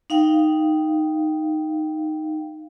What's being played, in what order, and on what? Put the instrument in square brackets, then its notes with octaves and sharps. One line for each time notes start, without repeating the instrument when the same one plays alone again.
[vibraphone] D#4 F5 G5